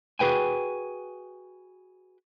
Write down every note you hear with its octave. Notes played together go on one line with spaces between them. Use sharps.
F#4 G#4 B4 G5 G#5